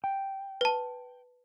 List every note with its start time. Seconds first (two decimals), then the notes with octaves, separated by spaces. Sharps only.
0.04 G5
0.61 B4 A5